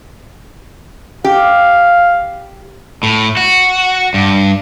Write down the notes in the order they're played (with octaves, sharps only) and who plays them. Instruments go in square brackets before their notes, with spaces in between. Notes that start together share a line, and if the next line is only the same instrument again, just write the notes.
[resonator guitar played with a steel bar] G4 [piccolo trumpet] F5
[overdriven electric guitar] A2
F#4
G2